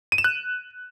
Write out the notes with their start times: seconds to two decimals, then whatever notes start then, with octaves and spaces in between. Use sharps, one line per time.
0.12 D#7
0.18 E7
0.24 F#6